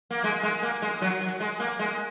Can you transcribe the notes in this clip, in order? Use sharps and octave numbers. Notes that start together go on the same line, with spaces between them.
A#3
G#3
G#3
A#3
G#3
F#3
F#3
G#3
A#3
G#3